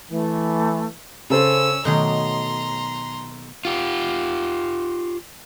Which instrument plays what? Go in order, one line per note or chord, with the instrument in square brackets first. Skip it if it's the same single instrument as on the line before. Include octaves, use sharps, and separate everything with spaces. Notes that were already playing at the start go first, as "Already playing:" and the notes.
[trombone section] E3 [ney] A3
[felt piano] C#3 A4 C5 [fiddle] C#4 E6
[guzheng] B2 D#3 F#3 [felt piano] A3 [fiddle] A#5 C6
[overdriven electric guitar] F4 G4